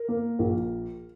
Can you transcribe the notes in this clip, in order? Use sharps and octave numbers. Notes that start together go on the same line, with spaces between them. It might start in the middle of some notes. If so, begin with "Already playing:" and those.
Already playing: A#4
A#3
A#1